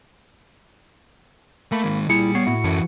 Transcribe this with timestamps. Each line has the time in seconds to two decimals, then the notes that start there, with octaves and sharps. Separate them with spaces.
1.72 A3 A#3 B5
1.84 D#3 G#3
2.10 A#2 G3 E4 G#4 C#7
2.35 B3 C#5 C7
2.47 A2 E4 F#4
2.64 F#2 E3 A4